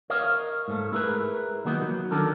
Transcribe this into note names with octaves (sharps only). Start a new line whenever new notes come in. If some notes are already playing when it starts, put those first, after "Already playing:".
A#4 C#5 D#5 F5
G#2 A3
E4 G#4 A#4 B4
D#3 F#3 A#3 B3 D#4
F#3
D3 D#3 D4 A4 A#4